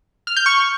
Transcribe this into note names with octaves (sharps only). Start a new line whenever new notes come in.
F6
G6
C#6